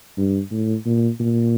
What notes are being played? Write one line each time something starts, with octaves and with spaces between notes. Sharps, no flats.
G2
A2
A#2
A#2